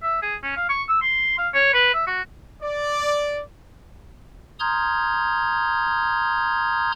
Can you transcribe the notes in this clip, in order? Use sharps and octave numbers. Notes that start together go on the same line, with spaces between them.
E5
G#4
C#4
F5
C#6
E6
C6
F5
C#5
B4
E5
F#4
D5
A#5 C6 D#6 F6 G6 G#6